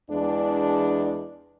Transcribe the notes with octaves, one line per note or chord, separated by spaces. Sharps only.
E2 E3 G#3 D4